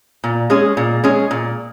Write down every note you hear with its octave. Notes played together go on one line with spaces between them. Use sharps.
A#2
G#3 C#4 G#4
A#2
G#3 C#4 G#4
A#2